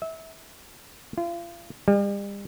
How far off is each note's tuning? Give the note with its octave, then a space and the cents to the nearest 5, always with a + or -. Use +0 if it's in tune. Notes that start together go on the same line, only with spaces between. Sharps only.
E5 -25
F4 -35
G3 +40